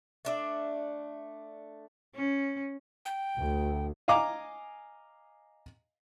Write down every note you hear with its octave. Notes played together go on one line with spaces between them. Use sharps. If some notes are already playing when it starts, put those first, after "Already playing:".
A3 D4 E5
C#4
G5
D2
D#5 F5 G#5 A#5 D6